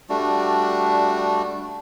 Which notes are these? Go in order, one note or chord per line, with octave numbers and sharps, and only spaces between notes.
G3 A3 D4 F#4